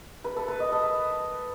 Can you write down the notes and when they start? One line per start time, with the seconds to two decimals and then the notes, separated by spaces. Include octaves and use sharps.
0.24 B4
0.36 A4
0.48 B4
0.60 D#5
0.72 A4